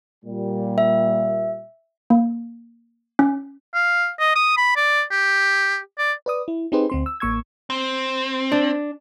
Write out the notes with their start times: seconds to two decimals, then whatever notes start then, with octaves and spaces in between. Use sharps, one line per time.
0.25 A#2 G3
0.78 E5
2.10 A#3
3.19 C#4
3.74 F5
4.19 D#5
4.35 D#6
4.57 B5
4.76 D5
5.11 G4
5.98 D5
6.26 B4 D5 D#6
6.48 E4
6.72 C4 D#4 G4 G#4 B4 C5
6.90 D2 C4 C6
7.06 E6
7.20 A1 A#3 C#6 E6 G#6
7.70 C4
8.52 D4